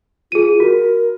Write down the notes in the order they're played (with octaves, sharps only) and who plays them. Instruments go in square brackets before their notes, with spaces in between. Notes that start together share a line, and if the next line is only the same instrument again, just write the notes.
[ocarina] F4 [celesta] G#4 D#7
[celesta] F#4 [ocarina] A#4